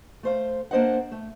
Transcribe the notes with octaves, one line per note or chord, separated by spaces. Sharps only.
A3 C5 F5
A#3 D4 C5 D#5 F#5
A3